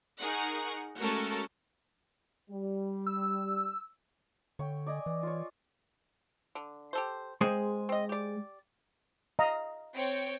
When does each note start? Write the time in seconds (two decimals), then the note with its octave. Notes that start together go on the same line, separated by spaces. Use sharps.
0.19 D#4 G#4 A#4 F#5 C#6
1.00 G#3 A3 C#4 F#4 A4 A#4
2.50 G3
3.07 E6
4.59 D3 C#5 G5
4.86 D5 D#5 G#5
5.06 E3
5.23 F4 C#5
6.55 D3
6.93 G4 A4 C5
7.41 G#3 C4 G#4 C5
7.89 C4 D#5
8.09 G4 D5
9.39 D#5 F5 A#5
9.95 C4 C#5 G5